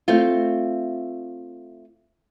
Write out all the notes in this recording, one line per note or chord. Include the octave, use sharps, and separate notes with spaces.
A3 C4 F4